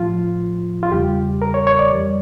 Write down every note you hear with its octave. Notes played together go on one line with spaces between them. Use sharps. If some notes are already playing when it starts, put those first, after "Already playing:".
Already playing: A2 F3 F4
F4
E2 C#3 G3 G4
A#4
C#5
C#5
D5
F2 E3 G3